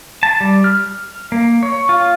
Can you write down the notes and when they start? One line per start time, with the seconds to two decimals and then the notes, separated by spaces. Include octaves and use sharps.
0.23 A5
0.41 G3
0.64 F6
1.32 A#3
1.63 C#5
1.89 F4